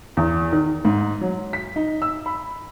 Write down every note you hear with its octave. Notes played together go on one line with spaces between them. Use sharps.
E2
D#3
G#2
F#3
B6
D#4
E6
B5